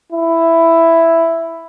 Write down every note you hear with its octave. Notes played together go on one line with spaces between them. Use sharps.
E4